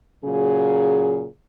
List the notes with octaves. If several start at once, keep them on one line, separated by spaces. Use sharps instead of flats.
A#2 C#3 F#3 G#4